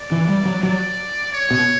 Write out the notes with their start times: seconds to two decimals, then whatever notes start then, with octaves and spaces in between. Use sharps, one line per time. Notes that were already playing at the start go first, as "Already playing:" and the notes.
Already playing: D5
0.12 E3
0.29 G3
0.45 F#3
0.63 F#3 D5
1.32 C#5
1.51 B2